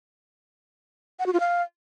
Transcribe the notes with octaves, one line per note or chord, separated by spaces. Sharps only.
F#5
F#4
F4
F5